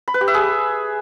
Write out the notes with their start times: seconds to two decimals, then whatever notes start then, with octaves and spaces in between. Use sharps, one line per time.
0.08 B5
0.14 B4
0.21 G4
0.28 E5
0.34 G#4